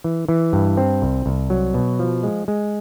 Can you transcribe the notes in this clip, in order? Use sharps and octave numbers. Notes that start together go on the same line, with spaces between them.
E3
E3
G2
C4
C2
C2
F#3
B2
F3
G#3
G#3